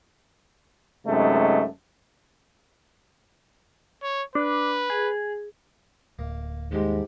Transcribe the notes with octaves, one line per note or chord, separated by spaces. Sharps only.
F#2 C3 G#3 A3 D#4
C#5
D4 B4
G#4
D1 A#3
D#2 G#2 G3 G#3 G4